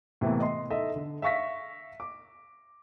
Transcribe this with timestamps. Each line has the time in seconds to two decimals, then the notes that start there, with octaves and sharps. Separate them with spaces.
0.21 A2 C3 E3 A#3 B3
0.40 D#5 C6
0.70 D#4 A4 D#5 E5
0.96 D3
1.22 E5 F5 C#6 A#6 B6
2.00 D6